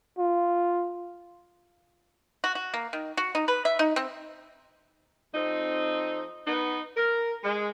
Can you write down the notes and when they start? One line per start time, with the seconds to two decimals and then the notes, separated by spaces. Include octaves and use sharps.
0.18 F4
2.44 F#4
2.55 F#4
2.74 A#3
2.93 D#3
3.17 F#4
3.35 D#4
3.48 B4
3.65 E5
3.79 D#4
3.96 C4
5.34 F2 C4 D#4
6.46 B3 D#4
6.97 A#4
7.43 G#3